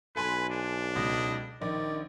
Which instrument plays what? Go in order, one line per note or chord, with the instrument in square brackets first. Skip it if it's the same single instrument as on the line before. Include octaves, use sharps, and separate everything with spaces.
[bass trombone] B1 [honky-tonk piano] A4 G#5 C6 [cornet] B4
[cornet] D4
[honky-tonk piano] C#2 B2 [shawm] D#5
[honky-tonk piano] A#1 [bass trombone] D#3 [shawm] D5